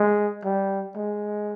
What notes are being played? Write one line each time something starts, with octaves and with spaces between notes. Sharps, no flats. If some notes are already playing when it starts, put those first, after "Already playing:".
Already playing: G#3
G3
G#3